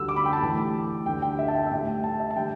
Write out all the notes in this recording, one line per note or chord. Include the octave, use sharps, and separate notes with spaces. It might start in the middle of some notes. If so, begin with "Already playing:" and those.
Already playing: D2 D3 G3 E6
D6
B5
G5
A5
A2 E3 G3
D2 D3 G3 G5
G5
E5
A5
G5
E5
A2 G3 G5
A5
E5
A5
D3 G3 G5